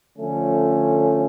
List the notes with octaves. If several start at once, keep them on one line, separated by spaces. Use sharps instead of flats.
D3 F3 A3 C#4